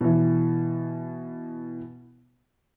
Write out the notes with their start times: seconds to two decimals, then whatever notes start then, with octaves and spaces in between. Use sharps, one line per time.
0.01 B2 E3